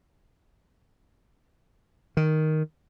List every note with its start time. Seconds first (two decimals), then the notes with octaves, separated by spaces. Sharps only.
2.17 D#3